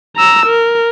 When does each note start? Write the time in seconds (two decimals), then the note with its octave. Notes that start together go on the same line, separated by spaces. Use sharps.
0.17 A#5 E6
0.46 A#4